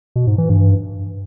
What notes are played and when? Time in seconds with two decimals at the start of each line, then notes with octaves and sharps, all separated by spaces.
0.16 B2
0.27 G#2
0.38 E3
0.49 G2